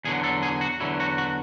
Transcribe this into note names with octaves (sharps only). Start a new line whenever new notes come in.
E2 D3 F#3 G#4
A4
G#4
F#4
E2 D3 F#3 E4
F#4
F#4